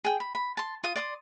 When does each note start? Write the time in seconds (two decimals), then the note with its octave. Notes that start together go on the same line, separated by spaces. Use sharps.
0.04 G#4 G5
0.20 B5
0.35 B5
0.57 A5 C6
0.83 F4 D#6
0.96 D5 C6 D#6